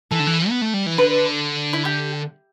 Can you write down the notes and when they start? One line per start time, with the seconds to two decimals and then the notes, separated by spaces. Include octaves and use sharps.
0.11 E3 A4
0.20 D3
0.27 E3
0.49 B3
0.62 A3
0.74 G3
0.86 E3
0.98 D3 B4
1.73 E4
1.85 G4